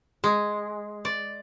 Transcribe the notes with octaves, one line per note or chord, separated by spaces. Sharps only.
G#3
D5